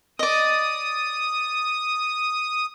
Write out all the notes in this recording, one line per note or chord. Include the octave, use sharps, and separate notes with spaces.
D5 D#5 D#6